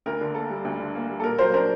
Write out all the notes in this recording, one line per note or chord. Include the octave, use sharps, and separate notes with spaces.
D2 A#4
D3
A#3 A4
G3
D2
D3
A#3
G3
A4
A#2 A#4
F#3 A#4 C5
D4 A#4 C5